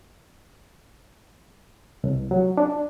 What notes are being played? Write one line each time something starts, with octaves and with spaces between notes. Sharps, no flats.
C2
F#3
D4